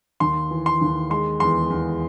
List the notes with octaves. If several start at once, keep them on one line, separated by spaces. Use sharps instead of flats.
D#2 C6
E3
C6
D#2
G#3 C6
E2 C6
E2